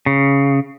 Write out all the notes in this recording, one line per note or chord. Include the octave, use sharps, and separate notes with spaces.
C#3